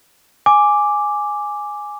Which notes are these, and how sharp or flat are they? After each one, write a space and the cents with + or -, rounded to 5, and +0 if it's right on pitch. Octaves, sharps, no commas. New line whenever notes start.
G#5 +0 D6 +0